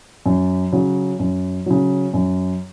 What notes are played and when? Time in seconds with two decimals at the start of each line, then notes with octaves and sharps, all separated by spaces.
0.26 F#2
0.72 C#3 F#3
1.19 F#2
1.66 C#3 F#3
2.14 F#2